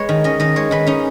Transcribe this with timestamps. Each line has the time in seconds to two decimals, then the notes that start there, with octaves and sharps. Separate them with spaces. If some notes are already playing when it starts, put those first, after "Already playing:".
Already playing: G#3 B4 C#5
0.09 D#3
0.24 C#4 D#5
0.40 D#3 D#5
0.56 G#3 C#5
0.71 D#3 B4
0.87 C#4 D#4